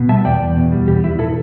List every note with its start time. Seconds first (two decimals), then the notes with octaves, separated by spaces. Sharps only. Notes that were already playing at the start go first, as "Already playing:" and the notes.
Already playing: B2
0.09 G3 E5 A5
0.25 E2 D5 G5
0.40 E2
0.56 B2
0.72 G3
0.87 E2 G4
1.03 E2 E4
1.19 B2 E4 A4